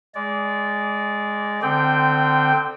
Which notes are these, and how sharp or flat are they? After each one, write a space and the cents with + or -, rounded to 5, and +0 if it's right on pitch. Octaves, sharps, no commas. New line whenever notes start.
G#3 +0 D5 -20
D3 +10 C4 -15 G5 +0